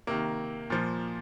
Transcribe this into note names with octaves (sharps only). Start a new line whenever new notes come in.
C3 D#3 A#3
A#2 F3